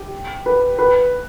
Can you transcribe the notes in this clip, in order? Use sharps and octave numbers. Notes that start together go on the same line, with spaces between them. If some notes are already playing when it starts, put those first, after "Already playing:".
Already playing: G4
B4
B4